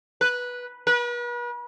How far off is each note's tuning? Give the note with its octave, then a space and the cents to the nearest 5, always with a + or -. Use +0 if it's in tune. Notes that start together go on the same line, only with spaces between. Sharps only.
B4 -10
B4 -40